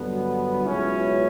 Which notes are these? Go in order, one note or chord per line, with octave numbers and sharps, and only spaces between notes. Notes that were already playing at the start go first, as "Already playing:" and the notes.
Already playing: G2 D3 F#3 B3
C#2 B2 F#3 C#4 E4